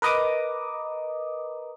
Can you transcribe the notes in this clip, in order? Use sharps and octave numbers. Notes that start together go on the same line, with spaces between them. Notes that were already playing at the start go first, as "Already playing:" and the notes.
A#4 B4 D#5 A#5 D6 D#6